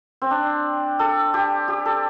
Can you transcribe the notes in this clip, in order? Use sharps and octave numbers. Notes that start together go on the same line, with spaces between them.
C4
D4
A4
G4
G4
A4